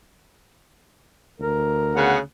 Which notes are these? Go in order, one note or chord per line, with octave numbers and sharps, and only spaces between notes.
D2 A#4
C#3 B3 F#5